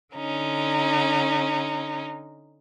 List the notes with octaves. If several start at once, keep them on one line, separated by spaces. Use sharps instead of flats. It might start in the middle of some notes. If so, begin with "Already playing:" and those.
D3 C#4 D#4